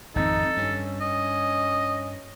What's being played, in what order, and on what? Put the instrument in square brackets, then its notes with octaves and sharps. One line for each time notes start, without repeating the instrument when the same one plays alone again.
[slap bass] G#1 F2 C4 [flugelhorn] D#4 [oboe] A4
[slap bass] G2 [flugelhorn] C#4
[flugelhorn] C#4 [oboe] D#5